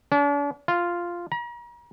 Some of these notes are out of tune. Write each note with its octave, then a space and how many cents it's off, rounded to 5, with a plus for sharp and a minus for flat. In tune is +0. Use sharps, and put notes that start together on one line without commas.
D4 -45
F4 -5
A#5 +40